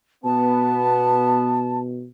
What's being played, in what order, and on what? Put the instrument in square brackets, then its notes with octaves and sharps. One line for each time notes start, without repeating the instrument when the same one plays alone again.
[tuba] B2 [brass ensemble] B3 [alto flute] A5